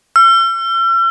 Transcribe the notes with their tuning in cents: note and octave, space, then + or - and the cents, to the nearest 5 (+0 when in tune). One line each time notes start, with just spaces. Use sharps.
E6 +45